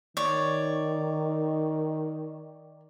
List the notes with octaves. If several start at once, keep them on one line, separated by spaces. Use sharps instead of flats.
D#3 C#5 D5